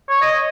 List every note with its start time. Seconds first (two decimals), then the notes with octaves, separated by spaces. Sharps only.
0.09 C#5
0.22 D#5